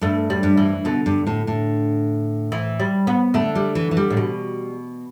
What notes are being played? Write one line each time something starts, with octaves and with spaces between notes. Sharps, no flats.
G2 A3
G3
G2
E3
B2 D3
G2
A2
A2
E3
G3
B3
D3 A3
G3
E3
E3
G3
A2
B2